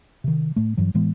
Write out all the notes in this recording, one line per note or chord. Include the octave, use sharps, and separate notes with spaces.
C3 D#3
A2 A3
G2 E3 F#3
A2 E3 G#3 B3